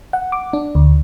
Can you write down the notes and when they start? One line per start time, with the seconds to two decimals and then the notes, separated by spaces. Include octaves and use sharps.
0.13 F#5
0.32 D6
0.53 D4
0.75 D2